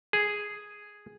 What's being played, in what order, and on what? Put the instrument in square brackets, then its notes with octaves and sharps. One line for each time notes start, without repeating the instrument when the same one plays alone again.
[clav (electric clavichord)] G#4